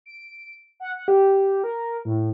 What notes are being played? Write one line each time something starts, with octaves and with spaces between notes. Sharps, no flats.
D7
F#5
F#5
G4
A#4
A2